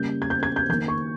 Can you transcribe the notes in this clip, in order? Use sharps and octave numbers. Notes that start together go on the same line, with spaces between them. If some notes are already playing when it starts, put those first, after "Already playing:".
Already playing: C#3 G3 A#3 G6
G#6
G6
G#6
G6
D#3 A#3 G6
C#6